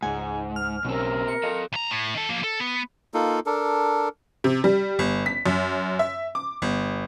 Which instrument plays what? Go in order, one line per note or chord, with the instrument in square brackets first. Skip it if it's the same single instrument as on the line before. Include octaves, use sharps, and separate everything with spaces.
[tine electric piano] C#2 F#5 [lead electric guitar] G#2 [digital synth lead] G#5
[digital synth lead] F6
[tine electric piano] B1 C#4 E6 [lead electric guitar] B2 C4 [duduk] A#4
[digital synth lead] C#7
[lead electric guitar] A4 D#5 [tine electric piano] F5 A#6
[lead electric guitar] B1 A#5
A2
D#3 A4
F3 A#3
A4
B3
[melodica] A#3 D#4 F4 A4
D4 A4 A#4
[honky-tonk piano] C3
G3
G1
B6
F#2
E5
D6
G1